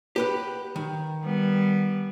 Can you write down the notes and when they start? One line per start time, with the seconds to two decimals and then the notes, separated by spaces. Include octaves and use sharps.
0.16 G4 B4 F#5
0.76 D#3
1.24 G3 B3